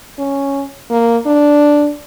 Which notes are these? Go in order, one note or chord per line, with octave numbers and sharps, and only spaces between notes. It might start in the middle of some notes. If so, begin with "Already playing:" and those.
C#4
A#3
D4